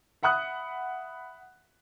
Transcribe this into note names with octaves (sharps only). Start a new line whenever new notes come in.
E5 F#5 B5 D#6 F#6